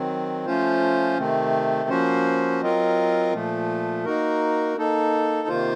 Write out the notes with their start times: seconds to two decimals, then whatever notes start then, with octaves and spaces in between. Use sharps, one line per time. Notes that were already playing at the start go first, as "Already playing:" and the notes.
Already playing: D#3 F#3 C4
0.46 F3 A3 C#4 F4 C5
1.18 C3 D#3 A3 C4
1.89 F3 A#3 C#4 F#4 C5
2.61 F#3 C4 F4 A#4 D#5
3.33 A#2 F3 A3
4.04 A#3 D#4 F#4 A#4
4.77 A#3 D#4 A4
5.48 C3 D#3 A#3 F4 C5